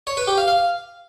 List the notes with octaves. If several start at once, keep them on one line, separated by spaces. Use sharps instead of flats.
C#5
B4
G4
F5
F5